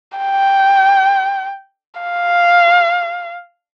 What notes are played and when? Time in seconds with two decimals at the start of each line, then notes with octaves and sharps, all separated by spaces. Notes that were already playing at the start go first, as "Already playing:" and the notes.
0.19 G5
2.01 F5